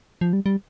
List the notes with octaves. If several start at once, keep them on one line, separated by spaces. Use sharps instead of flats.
F3
G3
G3